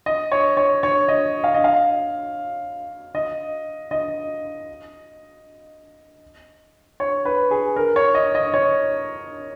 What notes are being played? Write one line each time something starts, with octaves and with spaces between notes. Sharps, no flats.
D#5
C#5
C#5
C#5
D#5
F5
D#5
F5
D#5
D#5
C#5
B4
G#4
A#4
C#5
D#5
D#5
C#5